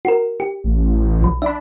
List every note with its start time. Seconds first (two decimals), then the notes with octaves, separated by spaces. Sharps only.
0.05 F#4 A#4
0.40 G4
0.64 A1
1.21 B1 F3
1.42 D4 E5 B5